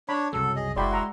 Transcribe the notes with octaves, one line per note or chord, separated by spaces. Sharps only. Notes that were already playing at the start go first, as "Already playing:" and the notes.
D4 C#5 B5
C2 F#2 C#3 F#3 A4
G#4 D#5
F#1 G#3 E4 F#4 D5 G5 B5 C6
F#5 A#5 E6